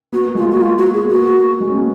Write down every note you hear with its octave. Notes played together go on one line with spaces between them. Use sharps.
B3 F#4
A#3
G#3 F4
A#3
F#4
F4
F#4
G#4
B3
A#3 F#4
G#3
C#4
B3